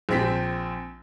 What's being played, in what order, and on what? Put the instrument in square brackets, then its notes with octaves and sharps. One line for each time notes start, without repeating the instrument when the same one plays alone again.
[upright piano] A#1 C4 B6